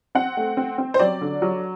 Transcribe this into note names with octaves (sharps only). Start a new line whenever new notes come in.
C4 F#5
A3
C4
C4
C5
F#3 D5
D3
F#3